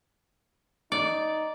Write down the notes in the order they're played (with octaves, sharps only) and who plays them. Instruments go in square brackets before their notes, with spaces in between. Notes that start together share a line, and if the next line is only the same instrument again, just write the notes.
[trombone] D#4 [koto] D5